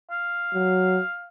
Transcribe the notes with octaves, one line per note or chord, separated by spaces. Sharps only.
F5
F#3